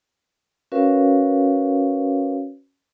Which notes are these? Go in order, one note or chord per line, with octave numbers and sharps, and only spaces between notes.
C#4 F#4 A#4 B4 C#5 F5